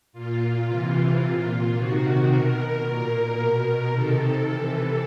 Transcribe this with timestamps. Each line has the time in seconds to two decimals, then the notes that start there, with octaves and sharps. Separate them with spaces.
0.12 A#2 F4
0.66 C3 E3
1.20 A#2
1.74 C3 D#3 F#4
2.28 B2 A#4
2.83 A#2
3.36 B2
3.90 C3 D#3 A4
4.45 C3 E3